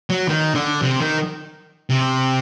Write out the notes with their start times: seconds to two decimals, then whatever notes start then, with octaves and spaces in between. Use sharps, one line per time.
0.10 F#3
0.28 D#3
0.55 D3
0.82 C3
1.01 D#3
1.90 C3